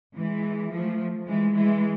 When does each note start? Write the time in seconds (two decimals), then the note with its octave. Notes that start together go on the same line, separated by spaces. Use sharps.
0.15 E3 G#3
0.71 F3 A3
1.27 E3 G#3
1.55 E3 G#3